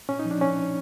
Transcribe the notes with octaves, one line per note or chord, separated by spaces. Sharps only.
A#2 C#4
D#4
F3
D4
A#2 C#4
F3